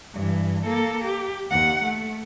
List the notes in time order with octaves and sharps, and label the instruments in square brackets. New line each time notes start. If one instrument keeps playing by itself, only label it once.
[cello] G2 E3
A#3 A4
G4
D#2 F#5
A3